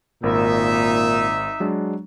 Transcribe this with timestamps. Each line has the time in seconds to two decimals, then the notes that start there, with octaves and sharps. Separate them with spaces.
0.23 G#1 A#2 D#4 A#4 E5 B5
1.60 F#3 G#3 D4